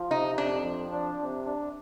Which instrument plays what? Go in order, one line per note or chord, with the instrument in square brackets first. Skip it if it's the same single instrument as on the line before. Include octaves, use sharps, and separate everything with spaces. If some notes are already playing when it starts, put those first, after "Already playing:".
Already playing: [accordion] F3
[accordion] C3 [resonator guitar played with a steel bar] D#4
[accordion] F2 [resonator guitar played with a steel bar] D4
[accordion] F3
D4
C3
D4